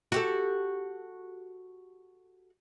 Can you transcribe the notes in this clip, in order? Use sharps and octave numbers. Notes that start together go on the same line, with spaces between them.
F#4 G4 A4